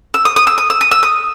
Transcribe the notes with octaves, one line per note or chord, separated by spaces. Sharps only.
E6
D#6
D#6
E6
D#6
E6
D#6
E6
D#6